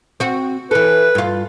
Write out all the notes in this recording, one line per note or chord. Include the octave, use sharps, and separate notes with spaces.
C4 F#4
E3 A4 B4
G2 F4